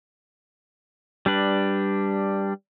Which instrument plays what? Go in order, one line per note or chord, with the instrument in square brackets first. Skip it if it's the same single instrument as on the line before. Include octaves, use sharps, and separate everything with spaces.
[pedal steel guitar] G3 D4 B4